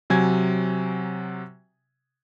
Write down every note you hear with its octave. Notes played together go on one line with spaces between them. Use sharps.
C3 F#3 G#5 G#6